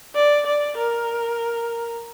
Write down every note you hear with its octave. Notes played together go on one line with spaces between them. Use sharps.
D5
D5
A#4